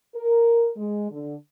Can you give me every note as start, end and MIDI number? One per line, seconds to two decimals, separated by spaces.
0.15 0.68 70
0.77 1.10 56
1.11 1.34 50